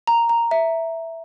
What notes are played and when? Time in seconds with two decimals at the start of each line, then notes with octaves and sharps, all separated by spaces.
0.07 A#5
0.29 A#5
0.51 E5